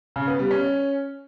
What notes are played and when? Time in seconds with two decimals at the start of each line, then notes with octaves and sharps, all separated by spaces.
0.16 C#3
0.27 B3
0.39 G3
0.51 C#4